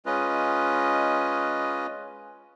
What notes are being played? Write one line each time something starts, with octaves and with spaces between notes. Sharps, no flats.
G#3 C#4 F4 B4 D#5